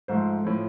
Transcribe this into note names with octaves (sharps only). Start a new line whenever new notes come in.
G#2 F3 A3 C5
A2 F3